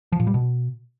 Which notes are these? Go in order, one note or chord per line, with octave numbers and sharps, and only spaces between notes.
F3
A#2
G3
B2